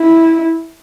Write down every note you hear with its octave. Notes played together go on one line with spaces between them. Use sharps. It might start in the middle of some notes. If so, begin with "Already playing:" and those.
Already playing: E4